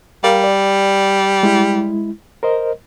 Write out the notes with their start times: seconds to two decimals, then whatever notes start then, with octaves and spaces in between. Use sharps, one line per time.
0.24 G3 A#4 F5
0.44 D5
1.43 G#3 E4
2.43 A#4 C5 D#5